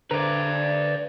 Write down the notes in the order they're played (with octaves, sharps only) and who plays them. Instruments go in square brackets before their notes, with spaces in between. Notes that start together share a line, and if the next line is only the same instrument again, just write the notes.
[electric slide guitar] D3 C5 A#5 [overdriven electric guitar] B4 D5